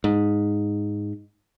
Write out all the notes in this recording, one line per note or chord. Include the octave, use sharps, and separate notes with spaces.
G#2